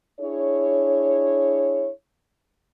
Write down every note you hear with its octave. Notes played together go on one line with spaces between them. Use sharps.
D4 E4 G#4 C#5